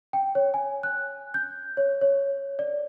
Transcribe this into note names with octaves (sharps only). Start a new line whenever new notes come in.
G5
C#5
G#5
F#6
G6
C#5
C#5
D5